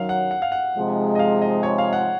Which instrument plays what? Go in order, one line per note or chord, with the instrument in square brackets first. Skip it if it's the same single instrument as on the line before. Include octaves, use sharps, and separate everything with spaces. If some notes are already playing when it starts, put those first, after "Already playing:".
Already playing: [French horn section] F#2 D#3 F#3 [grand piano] F5
[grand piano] F#5
F#5
F5
F#5
[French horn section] C3 F3 G#3 D#4
[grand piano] D#5
F5
D#5
C#5
F5
F#5